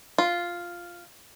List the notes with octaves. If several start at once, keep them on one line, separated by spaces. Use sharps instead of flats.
F4